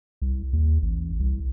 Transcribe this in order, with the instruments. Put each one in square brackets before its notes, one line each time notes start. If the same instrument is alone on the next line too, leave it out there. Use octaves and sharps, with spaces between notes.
[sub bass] C2
D#2
A1
C2